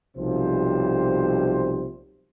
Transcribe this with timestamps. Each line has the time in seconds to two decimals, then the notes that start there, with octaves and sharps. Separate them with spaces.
0.16 B1 C3 F3 G3 A#3 C5